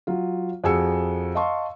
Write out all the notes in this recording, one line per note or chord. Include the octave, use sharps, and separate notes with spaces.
F#3 F4
F2 F#4 G#4 G#5 E6 C#7
D#5 F5 A5 C6 C#6